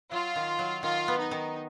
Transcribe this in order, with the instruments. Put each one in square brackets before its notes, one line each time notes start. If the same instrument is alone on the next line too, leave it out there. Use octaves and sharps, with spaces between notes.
[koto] F#3 [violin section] F4
[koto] D#3
F#3
[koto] D#3 [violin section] F4
[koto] B3
[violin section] D#4
[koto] D#3